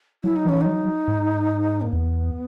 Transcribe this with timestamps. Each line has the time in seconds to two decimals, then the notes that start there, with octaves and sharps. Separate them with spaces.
0.24 F#3 E4
0.36 D#4
0.45 E3 C#4
0.61 D#4
0.66 F#3
1.08 G#2
1.81 A#3
1.92 E2 B3